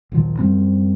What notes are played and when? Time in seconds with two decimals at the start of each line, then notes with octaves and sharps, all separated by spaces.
0.12 A#1 D#2 F3 F#3
0.39 F#2 F3 G3 C4